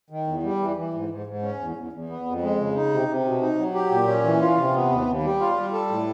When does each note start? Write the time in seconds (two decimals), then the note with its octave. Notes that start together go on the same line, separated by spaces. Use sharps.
0.10 D#3
0.27 E2
0.43 G3
0.60 E3
0.76 E3
0.94 G#2
1.09 G#2
1.27 G#2
1.42 C#4
1.59 E2
1.76 E2
1.93 E2
2.09 B3
2.26 F2
2.42 G#3
2.59 C#3
2.75 D#4
2.92 C3
3.08 C3
3.25 B2
3.41 D#4
3.58 F#3
3.75 G4
3.91 A#2
4.07 C#4
4.24 E3
4.41 F4
4.57 C3
4.74 B3
4.90 D#2
5.07 D#2
5.23 G3
5.40 F4
5.57 G3
5.73 A4
5.90 A2